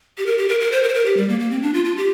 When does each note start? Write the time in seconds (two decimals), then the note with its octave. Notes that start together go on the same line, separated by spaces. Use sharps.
0.18 G4
0.26 A#4
0.38 G4
0.48 A#4
0.60 A#4
0.72 C5
0.83 A#4
0.88 C5
0.94 A#4
1.05 G4
1.17 G3
1.29 A#3
1.39 A#3
1.51 C4
1.62 D4
1.74 F4
1.85 F4
1.97 G4